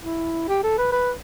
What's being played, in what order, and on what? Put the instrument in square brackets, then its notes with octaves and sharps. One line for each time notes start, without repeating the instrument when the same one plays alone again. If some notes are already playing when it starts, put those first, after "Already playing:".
[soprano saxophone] E4
G4
A4
B4
B4